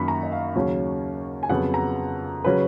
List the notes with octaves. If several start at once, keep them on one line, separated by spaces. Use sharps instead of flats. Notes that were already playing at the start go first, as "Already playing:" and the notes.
Already playing: F#2 D#3 F#3 A#3 B5 C#6
A#5
D#5
F5
D#2 C#3 F#3 C#4
G#5
F2 C#3 F#3 B3 F#5
A#5
C#3 F#3 C#4 B4